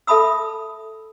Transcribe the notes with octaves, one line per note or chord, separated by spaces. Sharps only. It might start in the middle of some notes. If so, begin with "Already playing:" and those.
A4 E5 A5 B5 D#6 E6